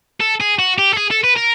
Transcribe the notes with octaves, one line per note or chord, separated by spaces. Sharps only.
A4
G#4
F#4
G4
A4
G#4
A4
B4
A#4